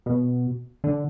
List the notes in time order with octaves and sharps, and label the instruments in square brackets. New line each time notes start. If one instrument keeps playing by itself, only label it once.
[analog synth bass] B2
D3